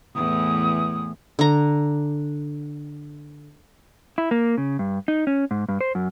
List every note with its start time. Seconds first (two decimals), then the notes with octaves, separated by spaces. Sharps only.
0.15 E2 A2 E3 D#6
1.39 D3 A#5
4.18 E4
4.31 A#3
4.58 C#3
4.79 G2
5.08 D#4
5.27 C#4
5.51 G#2
5.69 G2
5.81 C5
5.95 F#2